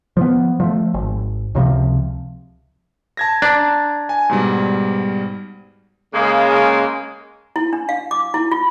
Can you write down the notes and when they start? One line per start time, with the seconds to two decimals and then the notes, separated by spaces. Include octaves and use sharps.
0.17 F3 B3
0.60 F3 A3
0.94 G#1
1.55 C#2 C3 E3 F3
3.17 A5 G#6 A#6
3.42 D4 A#5
4.09 G#5
4.29 G#2 B2 G3
6.14 C#3 G#3 A#3
7.56 E4
7.73 D4
7.89 F5
8.11 D6
8.34 E4
8.51 F4